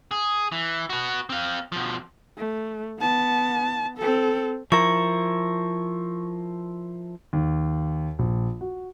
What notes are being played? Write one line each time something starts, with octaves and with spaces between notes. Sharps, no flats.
G#4
E3
F#4 B4
C4 F5
B2 F3
A3
B3 A5
C4 A4
F3 E4 A#4 C#6
D#2
A#1
F#4